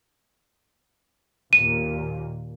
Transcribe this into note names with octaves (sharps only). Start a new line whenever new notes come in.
D#2 A#2 D#7